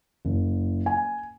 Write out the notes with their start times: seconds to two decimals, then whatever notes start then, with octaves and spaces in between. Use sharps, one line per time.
0.25 F#1
0.86 G#5